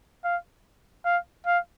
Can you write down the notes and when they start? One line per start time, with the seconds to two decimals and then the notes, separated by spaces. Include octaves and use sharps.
0.24 F5
1.05 F5
1.46 F5